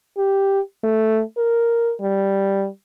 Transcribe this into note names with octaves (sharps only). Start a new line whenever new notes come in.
G4
A3
A#4
G3